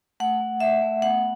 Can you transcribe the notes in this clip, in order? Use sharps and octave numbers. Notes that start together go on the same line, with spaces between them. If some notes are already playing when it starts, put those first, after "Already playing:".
A3 F#5
A3
A3 E5
A3
B3 F#5